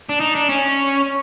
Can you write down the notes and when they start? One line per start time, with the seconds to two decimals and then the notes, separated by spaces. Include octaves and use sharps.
0.09 D4
0.20 D#4
0.35 D4
0.49 C#4